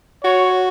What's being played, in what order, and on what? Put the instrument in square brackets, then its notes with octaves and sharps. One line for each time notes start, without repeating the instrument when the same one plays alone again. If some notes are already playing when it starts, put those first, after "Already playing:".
[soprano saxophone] F#4 [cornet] C#5